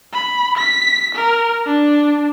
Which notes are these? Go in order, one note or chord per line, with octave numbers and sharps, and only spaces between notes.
B5
B6
A#4
D4